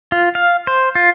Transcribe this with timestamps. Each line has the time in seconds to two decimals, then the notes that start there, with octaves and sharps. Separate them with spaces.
0.12 F4
0.35 F5
0.67 C5
0.95 F4